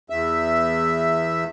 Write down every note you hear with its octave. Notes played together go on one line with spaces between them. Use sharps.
E2 E5